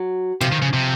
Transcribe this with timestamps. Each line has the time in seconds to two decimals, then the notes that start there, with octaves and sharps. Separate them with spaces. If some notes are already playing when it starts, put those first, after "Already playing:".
Already playing: F#3
0.41 C3 F3
0.52 D#3
0.62 C#3
0.73 C3